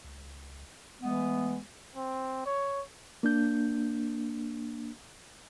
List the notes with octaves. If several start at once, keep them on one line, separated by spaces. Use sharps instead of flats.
C#2
E3 G#3 A3 B3
C4
C#5
A#3 D4 G6